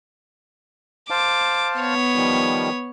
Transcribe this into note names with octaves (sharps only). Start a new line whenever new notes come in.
C5 F5 A5 D6
B3 C#5
D#3 F3 G3